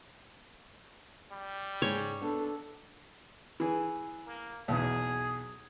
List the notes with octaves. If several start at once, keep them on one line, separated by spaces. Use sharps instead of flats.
G3
G#2 C#3 G#4 C#5
B3 D4 A4
E3 G#4
A#3
B1 E2 G#4